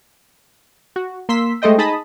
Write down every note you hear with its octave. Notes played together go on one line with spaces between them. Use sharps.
F#4
A#3 C6 E6 B6
G#3 A3 A4 C5 D#5 G5
D#4 G#4 D#5 A5 B5 D#6